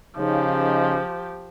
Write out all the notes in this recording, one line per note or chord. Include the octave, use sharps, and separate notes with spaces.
C#3 F3 D#4 G4